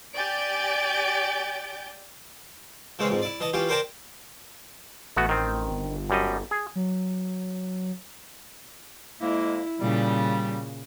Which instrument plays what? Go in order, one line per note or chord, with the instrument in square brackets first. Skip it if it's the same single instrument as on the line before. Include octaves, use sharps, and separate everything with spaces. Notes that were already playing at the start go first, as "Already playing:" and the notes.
[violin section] G4 D5 G#5 G6 A6 D7
[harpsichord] C#3 E3 G#3 C4 C#4
F2 G#2
E4 D5
E3 D#5 A5
E3 C#4 F4 G4
A#4 C5 D5 G5 A5 A#5
[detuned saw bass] A1 [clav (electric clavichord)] A3 B3 F#4
[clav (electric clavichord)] D#3 C4
[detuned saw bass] G1
[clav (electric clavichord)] F#2 G3 D#5
G#4
[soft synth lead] F#3
[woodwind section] F2 G#3 A#3 [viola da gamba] E4
[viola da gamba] A#2 C#3 [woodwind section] G3